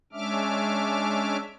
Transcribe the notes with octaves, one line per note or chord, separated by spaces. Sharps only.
G#3 C#4 D4 E5 D6 F6